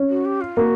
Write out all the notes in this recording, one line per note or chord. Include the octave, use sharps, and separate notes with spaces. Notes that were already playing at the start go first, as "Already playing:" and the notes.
Already playing: C#4
F#4
G4
F4
A#3 F#4